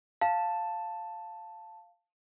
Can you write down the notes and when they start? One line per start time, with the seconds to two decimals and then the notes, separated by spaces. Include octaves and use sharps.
0.21 F5 A5